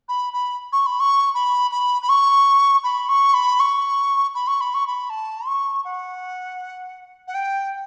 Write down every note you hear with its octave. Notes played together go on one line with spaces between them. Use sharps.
B5
B5
C#6
B5
C#6
B5
B5
B5
C#6
B5
C#6
B5
C#6
B5
C#6
B5
C#6
B5
A5
C#6
F#5
F#5
G5